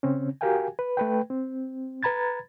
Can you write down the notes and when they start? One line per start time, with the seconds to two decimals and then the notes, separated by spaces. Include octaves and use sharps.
0.03 C#3 C4 C#4
0.41 F#4 G4 A#4 F5 G5 G#5
0.79 B4
0.97 A3 B4 G5
1.30 C4
2.03 B4 A#5 B5 G#6 A6